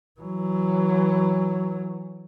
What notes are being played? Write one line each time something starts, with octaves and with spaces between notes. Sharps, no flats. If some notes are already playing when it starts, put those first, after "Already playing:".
E3 F#3